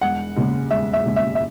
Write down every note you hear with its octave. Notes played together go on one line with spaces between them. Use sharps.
E1 F#5
D#2 C#3 G#3
E1 E5
E5
D#2 C#3 G#3
E5
E5